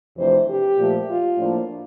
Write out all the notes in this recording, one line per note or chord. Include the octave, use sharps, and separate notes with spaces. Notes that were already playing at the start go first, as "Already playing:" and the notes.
F2 C3 E3 A3 D4 C5
G4
A#2 F3 A3
F4
A2 F3 A#3 D4